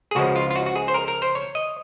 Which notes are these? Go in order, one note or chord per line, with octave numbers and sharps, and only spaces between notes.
G#4
C#2 C#3 F3 G#3 F#4
F4
F4
F#4
F#4
G#4
C5
A#4
A#4
C5
C#5
D#5